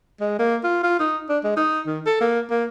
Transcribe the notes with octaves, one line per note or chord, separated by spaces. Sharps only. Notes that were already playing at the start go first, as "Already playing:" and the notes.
G#3
A#3
F4
F4
D#4
D4
G#3
D#4
D#3
A4
A#3
A#3